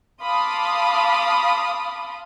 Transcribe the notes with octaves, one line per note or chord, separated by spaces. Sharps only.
F5 A5 B5 C6 D6 D#6